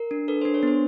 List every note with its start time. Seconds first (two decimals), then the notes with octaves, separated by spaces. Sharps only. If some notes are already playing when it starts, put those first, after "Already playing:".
Already playing: A#4
0.11 D4
0.28 A4 B4
0.41 D4 C5
0.54 C#5
0.63 B3 C5